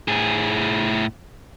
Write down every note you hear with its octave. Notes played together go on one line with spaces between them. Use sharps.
A2 G#4